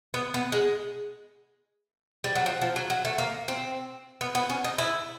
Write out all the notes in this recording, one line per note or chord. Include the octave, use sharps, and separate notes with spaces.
B3
B3
G#3
G3
F#3
F3
F3
F#3
F#3
A3
A#3
C4
B3
B3
C#4
D#4
E4